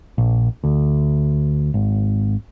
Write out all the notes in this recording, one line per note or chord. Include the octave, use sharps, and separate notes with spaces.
A#1
D2
G#1